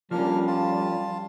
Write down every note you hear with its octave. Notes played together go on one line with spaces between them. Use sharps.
F3 G3 A#3 C#4 D4 F6
F4 A5